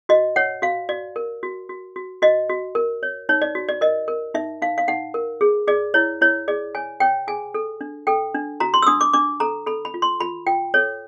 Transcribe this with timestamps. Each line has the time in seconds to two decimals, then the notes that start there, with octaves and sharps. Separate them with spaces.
0.09 F#4 D#5
0.36 C#5 F#5
0.62 F#4 F5
0.89 F#4 D5
1.16 A#4
1.43 F#4
1.69 F#4
1.96 F#4
2.22 F#4 D#5
2.49 F#4
2.75 A#4
3.03 C#5
3.29 D#4 C#5
3.42 D5
3.55 F#4
3.69 D5
3.81 A#4 D#5
4.08 A#4
4.34 D#4 E5
4.62 D#4 F5
4.78 F5
4.88 D#4 F#5
5.14 A#4
5.41 G#4
5.67 G#4 D5
5.94 E4 C#5
6.21 E4 C#5
6.48 G#4 D5
6.75 C#5 G#5
7.00 C#5 G5
7.27 G#4 G#5
7.54 A4
7.81 D4
8.07 A4 G5
8.35 D4
8.60 F#4 A#5
8.74 C6
8.82 E6
8.87 D4 D#6
9.01 D6
9.13 D4 D6
9.40 A4 A#5
9.66 A4 B5
9.85 B5
9.94 F4
10.02 C6
10.21 F4 B5
10.47 F4 G5
10.74 A4 C#5